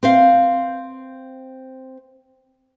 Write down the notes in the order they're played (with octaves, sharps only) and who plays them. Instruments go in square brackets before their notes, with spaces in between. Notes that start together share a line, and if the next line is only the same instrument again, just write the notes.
[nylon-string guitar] C4 C5 F5